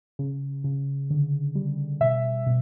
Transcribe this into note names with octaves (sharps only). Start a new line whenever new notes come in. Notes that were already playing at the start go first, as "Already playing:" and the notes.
C#3
C#3
D3
G3
B2 E5
B2